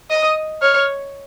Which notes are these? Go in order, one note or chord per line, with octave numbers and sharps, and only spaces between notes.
D#5 D#6
C#5 F6